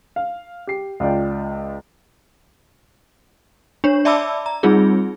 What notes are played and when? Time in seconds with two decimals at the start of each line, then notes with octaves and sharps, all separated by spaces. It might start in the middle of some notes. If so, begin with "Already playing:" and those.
0.16 F5
0.67 G4 C7
1.00 C#2 F4 D5 G5
3.84 D4 C#5
4.05 D5 E5 A5 B5 D6 E6
4.46 A#5
4.63 G3 C4 D#4 F4 G#4